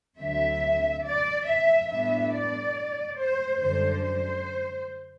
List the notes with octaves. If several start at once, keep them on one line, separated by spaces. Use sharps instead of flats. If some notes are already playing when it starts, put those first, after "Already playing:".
D2 D3 F#3 C4 E5
D5
E5
A2 G3 B3 D4 E5
D5
C5
F#2 D3 G3 C5
C5